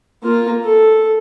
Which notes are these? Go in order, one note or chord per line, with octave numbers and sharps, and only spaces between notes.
A#3 F4
A4